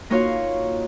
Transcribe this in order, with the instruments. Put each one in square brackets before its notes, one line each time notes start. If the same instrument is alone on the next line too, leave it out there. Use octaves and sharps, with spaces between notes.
[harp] A#3 D#4 F4 F#4 C#5 F5